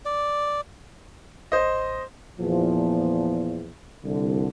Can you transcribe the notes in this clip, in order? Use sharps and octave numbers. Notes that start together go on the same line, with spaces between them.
D5
A1 C5 D#5
E2 A#2 F3
C2 D3